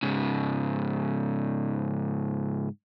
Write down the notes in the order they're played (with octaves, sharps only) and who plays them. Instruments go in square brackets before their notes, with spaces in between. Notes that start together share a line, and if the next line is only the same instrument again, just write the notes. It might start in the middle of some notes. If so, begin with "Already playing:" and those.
[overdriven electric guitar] G#2 C#3